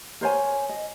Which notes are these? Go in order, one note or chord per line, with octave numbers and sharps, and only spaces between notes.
A#4 C5 C#5 G#5
D#5